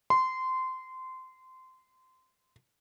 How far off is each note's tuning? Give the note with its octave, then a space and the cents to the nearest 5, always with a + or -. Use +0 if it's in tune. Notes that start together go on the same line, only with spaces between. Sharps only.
C6 -20